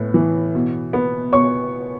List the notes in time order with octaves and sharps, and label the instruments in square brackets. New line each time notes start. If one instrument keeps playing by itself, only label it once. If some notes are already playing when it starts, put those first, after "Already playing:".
Already playing: [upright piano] A2 B3
E3
B2
B3
B2 C#5 C#6